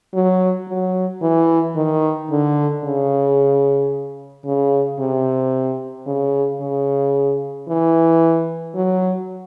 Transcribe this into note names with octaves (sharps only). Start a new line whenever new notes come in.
F#3
F#3
E3
D#3
D3
C#3
C#3
C3
C#3
C#3
E3
F#3